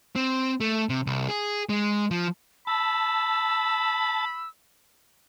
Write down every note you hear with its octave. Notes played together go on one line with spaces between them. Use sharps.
C4
A3
C3
C2
G#4
G#3
F3
A5 B5 E6